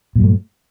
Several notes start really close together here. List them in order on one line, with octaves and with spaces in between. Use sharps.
A#2 F#3 G2 A3